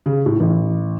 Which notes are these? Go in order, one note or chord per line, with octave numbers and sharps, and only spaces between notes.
C#3
A2
A1